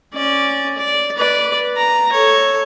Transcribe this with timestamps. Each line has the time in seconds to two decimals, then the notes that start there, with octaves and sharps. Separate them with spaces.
0.14 C#4 D5
0.77 D5
1.17 B4 D5
1.76 A#5
2.12 A4 C#5